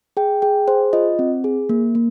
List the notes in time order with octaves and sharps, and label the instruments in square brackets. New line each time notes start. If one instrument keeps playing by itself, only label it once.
[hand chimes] G#4 G5
G#4 G5
G#4 C5
F4 D#5
C4
G#4
A#3
A#3